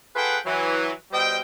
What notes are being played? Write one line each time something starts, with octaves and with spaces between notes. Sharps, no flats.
F4 G#4 A4 B4 F#5 G5
E3 F#3
B2 G3 C5 D#5 G5